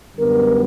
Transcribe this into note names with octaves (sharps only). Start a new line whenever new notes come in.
F#2 D3 G3 B3 A#4